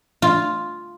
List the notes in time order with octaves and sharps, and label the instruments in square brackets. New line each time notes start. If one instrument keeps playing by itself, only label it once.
[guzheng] F4